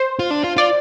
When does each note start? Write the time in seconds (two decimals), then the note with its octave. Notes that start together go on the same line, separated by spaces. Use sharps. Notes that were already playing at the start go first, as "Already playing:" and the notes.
Already playing: C5
0.19 F4
0.31 D4
0.44 F4
0.57 F4 D5